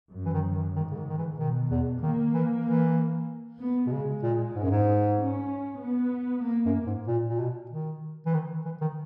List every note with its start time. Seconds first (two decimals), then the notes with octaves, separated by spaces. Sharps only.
0.13 F#2
0.25 E3
0.34 D#3
0.54 D#3
0.76 G#2 D#3
0.91 C#3
0.97 D#3
1.09 D#3
1.18 E3
1.39 B2 D#3
1.71 E2
2.02 D#3 A#3
2.34 E3
2.66 E3
3.60 B3
3.87 B2
3.92 C#3 G#3
4.23 A#2
4.55 G#2
4.63 F#2
4.71 G#2
5.18 C#4
5.82 B3
6.45 A#3
6.66 F#2
6.86 G#2
7.07 A#2
7.29 A#2
7.39 B2
7.71 D#3
8.26 E3
8.34 D#3
8.65 E3
8.81 D#3